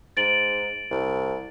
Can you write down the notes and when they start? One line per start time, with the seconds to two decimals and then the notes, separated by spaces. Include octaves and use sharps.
0.17 G#2 A6 D7 F#7
0.91 C2